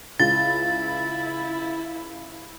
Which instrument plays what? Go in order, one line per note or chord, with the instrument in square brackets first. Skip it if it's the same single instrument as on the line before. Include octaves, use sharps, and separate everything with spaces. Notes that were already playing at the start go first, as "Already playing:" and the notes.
[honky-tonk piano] C#2 [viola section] E4 [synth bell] A6